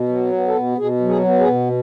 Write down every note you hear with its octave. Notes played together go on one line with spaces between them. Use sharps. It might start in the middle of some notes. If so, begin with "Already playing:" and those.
Already playing: B2
F#3
B3
A4
B2
B2 G#4
F#3
G#4
B3
G#4
B2